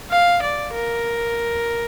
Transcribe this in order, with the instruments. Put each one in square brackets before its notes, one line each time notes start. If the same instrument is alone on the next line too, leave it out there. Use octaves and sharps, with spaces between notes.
[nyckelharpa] F5
D5
A#4